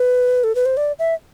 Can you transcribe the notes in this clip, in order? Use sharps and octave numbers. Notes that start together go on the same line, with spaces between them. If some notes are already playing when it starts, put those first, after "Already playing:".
Already playing: B4
A4
B4
C5
D5
E5